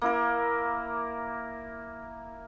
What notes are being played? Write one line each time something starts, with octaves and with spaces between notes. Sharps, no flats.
A#3 E4 A#4